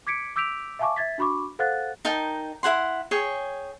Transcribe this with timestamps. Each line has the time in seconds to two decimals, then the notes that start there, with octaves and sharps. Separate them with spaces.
0.07 D6 G#6 B6 C#7 D7
0.36 D6 E6 G6 B6 D7 F7
0.79 E5 F5 G#5 A5 C#6 D6
0.96 E5 G#6 A6 B6
1.18 D4 F#4 B5 C#6 D6
1.59 A4 C5 F5 F#5 F#6 A6
2.05 D#4 A#4 G5 A5
2.63 E4 G#4 F#5 C6
3.11 G#4 C#5 G5